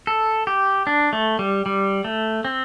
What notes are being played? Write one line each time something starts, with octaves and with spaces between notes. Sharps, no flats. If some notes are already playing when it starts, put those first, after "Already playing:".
A4
G4
D4
A3
G3
G3
A3
C4